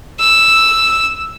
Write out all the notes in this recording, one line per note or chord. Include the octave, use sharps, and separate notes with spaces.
E6